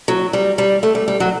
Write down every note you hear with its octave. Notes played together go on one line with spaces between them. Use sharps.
F#3
G3
G3
A3
G3
G3
F#3